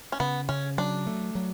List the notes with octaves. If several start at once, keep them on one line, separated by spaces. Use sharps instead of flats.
C#4
C#3 B3
C#3 C#4
F#3 D4
A3
F#3